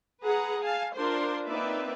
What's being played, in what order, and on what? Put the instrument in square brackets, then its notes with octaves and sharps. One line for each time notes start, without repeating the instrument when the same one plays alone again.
[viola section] G#4 B4 F#5 A#5
F5 G#5 A5
D4 F4 A#4 C5 C6
A#3 C4 D#4 B4 D5 E5